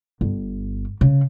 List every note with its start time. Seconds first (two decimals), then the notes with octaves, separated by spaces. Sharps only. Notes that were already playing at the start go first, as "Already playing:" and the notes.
0.21 G1
1.01 C#3